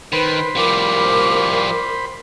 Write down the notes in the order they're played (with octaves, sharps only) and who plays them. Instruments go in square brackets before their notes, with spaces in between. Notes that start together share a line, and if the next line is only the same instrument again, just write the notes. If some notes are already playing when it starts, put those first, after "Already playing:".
[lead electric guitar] D#3 [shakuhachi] B4 [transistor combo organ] C5 B5
[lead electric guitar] F3 G3 [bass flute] A#4 [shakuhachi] D6